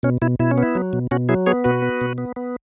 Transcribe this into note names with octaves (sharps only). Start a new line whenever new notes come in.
B2 C#4
B2 E4
B2 E4
C#4
B3 E4
F#3
B2
B2 C#4 F#4
F#3 E4 G#4
B3 G#4 C#5
B2 F#4 B4
B3
B2
B3
B3